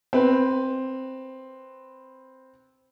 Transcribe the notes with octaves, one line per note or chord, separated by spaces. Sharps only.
C4 B4